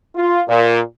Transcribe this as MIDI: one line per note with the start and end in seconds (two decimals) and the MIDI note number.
0.16 0.44 65
0.48 0.80 46